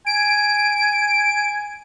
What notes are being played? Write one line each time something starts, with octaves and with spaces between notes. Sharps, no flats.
G#5 D7